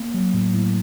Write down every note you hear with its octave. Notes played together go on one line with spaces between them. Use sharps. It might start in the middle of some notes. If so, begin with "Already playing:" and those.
Already playing: A#3
F#3
A2
A2